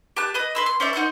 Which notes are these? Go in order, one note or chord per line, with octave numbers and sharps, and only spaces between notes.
G4 A5 F#6
B4 D#5 D#6
B4 C6 E6
C6
C#4 C5 D5 E5
D#4 F#5 C6 G6